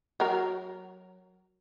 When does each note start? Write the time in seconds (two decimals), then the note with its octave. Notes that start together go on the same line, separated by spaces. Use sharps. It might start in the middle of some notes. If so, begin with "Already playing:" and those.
0.20 F#3 A#4